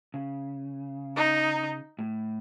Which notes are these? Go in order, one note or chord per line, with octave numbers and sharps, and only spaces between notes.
C#3
D#4
A2